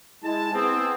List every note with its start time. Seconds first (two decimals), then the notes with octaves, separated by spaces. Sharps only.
0.23 G#3 E4 A5
0.54 B3 C4 G#4